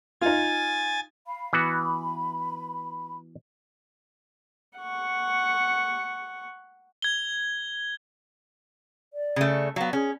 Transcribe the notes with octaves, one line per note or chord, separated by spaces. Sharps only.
D#4 F4 G#5 A6
F5 B5
E3 B3 F#4 B5
F#5 C#6
G#6 G7
D5
C#3 A3
F#3 B3 F5
C#4 G#4